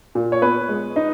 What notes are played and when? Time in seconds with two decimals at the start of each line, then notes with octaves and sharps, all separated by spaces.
0.15 A#2
0.32 C#5
0.42 B3 B4
0.69 G#3
0.96 D#4